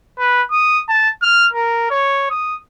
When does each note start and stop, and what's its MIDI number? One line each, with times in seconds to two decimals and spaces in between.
0.19 0.43 71
0.52 0.81 87
0.89 1.09 81
1.22 1.46 89
1.53 1.87 70
1.91 2.28 73
2.30 2.57 87